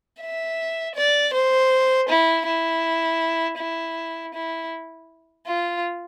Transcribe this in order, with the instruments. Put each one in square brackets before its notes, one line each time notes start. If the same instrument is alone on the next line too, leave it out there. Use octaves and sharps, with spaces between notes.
[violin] E5
D5
C5
E4
E4
E4
E4
F4